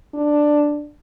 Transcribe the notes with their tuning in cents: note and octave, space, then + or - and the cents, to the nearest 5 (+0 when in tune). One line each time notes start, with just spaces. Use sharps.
D4 +5